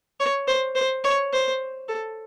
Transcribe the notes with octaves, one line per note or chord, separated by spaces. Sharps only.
C#5
C5
C5
C#5
C5
A4